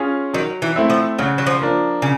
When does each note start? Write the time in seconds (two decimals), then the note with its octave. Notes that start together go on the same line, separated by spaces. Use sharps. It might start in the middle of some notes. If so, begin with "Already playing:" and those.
Already playing: C#4 F4 G#4
0.34 D#3 F#3
0.62 E3
0.76 A3 C4 E4
0.90 F3
1.19 C#3 F#3
1.38 F#3
1.47 F3
1.61 F3 A#3 D4
2.02 C#3